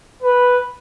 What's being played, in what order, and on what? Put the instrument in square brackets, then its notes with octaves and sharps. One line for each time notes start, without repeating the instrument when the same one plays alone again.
[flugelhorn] B4